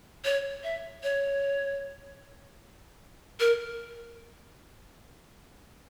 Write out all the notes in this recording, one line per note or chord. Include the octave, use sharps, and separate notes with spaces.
C#5
E5
C#5
A#4